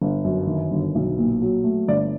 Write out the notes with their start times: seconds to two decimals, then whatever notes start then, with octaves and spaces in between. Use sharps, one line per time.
0.02 G1
0.24 F#2
0.47 D#3
0.71 G1
0.95 B1
1.18 A#2
1.42 F#3
1.64 A3
1.88 G1 D5